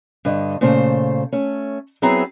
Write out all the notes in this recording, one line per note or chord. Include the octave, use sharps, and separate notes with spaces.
G2 D3 D#5
A#2 C#3 A3 C5
A3 C#4
F#3 B3 C4 E4 G#4 A#5